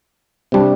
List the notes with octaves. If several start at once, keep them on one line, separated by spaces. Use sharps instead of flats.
C3 G3 D4